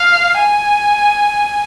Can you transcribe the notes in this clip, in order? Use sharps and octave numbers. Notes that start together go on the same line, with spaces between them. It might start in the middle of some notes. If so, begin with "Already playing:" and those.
Already playing: F5
G#5